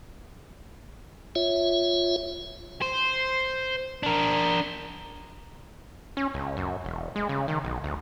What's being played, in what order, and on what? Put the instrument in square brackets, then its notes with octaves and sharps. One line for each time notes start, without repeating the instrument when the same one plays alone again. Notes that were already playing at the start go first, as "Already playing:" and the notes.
[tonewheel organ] F4 C#5 E5
[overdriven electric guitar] C5
D4 A#4
[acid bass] C#4
C#2
F#2
E1
G#3
C#3
D#3
B1
D2